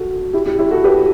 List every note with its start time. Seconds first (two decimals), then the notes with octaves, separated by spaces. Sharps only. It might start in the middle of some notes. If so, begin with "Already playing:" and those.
Already playing: F#4 A4
0.33 E4 G4
0.46 E4 G4
0.59 E4 G4
0.71 F#4 A4
0.84 G4 B4